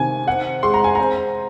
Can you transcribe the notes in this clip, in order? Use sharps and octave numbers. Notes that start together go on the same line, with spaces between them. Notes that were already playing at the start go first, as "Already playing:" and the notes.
Already playing: C3 D#3 G#5
C4 F#5
G#3 C6
A#5
G#5
C4 A#5